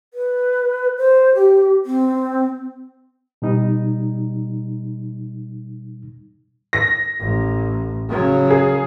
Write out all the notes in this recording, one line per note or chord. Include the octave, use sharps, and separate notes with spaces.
B4
C5
G4
C4
B2 G3 D#4
A#6
A1
C#3 F#3
G#4